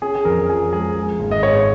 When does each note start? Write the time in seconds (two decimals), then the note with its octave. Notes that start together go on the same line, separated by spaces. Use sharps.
0.02 C#4 G#4
0.15 G#4
0.25 F2 A#4
0.49 F3 G#4
0.72 G#3 G#4
0.96 G#3
1.19 G#1
1.31 D#5
1.43 G#2 C#5